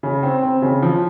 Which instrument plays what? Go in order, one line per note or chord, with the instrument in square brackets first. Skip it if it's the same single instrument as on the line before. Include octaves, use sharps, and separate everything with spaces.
[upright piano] C#3
C4
C4
C#3
F3